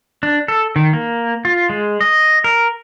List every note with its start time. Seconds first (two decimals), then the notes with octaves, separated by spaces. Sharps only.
0.23 D4
0.48 A4
0.76 D#3
0.93 A#3
1.45 F4
1.70 G#3
2.01 D#5
2.44 A#4